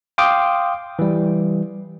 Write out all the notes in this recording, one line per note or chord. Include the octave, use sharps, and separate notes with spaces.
F5 G5 C6 D6 D#6
E3 G3